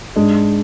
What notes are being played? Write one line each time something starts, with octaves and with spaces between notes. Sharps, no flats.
G#2 G#3 D4